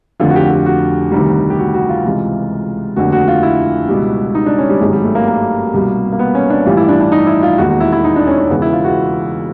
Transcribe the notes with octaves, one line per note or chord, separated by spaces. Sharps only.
F1 F2 D3 F4
F#4
G4
G4
F#4
D2 C3 D#3 G3
G4
F#4
F#4
F4
C#2 C3 E3
F1 D#2 D3 F#4
F#4
F4
E4
C#2 B2 G3
D#4
D4
C#4
G3
G#1 G2 D#3 F#3 G#3
G3
A3
A#3
A#3
C2 B2 G3
A#3
B3
C#4
D4
A1 G2 E3 G3 F4
E4
D4
D4
D#4
E4
F4
E1 D#2 D#3 F#4
F#4
E4
E4
D#4
D4
C#4
C#4
E1 E2 C#3 B3
E4
F4
F#4